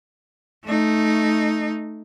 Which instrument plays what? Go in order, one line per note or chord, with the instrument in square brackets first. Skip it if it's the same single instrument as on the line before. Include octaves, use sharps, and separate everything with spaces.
[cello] A3 D#4